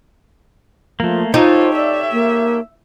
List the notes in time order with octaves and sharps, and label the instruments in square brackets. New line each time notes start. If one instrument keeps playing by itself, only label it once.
[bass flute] F3 [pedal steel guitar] A3 A#3
[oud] D#4 [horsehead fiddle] F4 [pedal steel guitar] G4 A4 C#5 [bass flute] C5
[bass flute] D5 [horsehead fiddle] E5
[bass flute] A#3